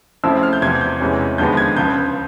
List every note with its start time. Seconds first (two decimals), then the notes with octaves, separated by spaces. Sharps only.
0.24 C#3 F3 A3 C4 E4 E6
0.43 F6
0.53 G6
0.62 E2 C3 F3 G#6
0.75 G#6
0.81 G6
1.00 E2 C3 E3 G#3 C#4
1.38 D#2 D3 F3 G#3 B3 G6
1.57 G#6
1.77 C#2 C#3 F3 G6